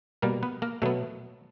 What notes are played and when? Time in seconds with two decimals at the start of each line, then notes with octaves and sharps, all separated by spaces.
0.22 B2 G3 A#3 A#4
0.43 B3 B4
0.62 A#3 A#4
0.82 B2 F#3 A3 B3 A4